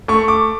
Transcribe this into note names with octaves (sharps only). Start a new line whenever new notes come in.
A3 C#6
D6